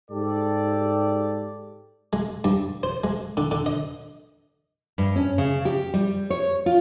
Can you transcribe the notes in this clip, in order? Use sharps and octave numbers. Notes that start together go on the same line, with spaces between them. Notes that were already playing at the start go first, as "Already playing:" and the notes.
G#2 G4 A4 D5
G#3
G2
C5
G#3
D3
D3
D#5
G2
C#4
C#3
G4
G3
C#5
F4